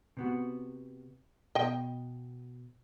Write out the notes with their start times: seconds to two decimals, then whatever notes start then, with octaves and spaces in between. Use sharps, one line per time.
0.17 C3 B3 F#4
1.55 B2 D#5 G5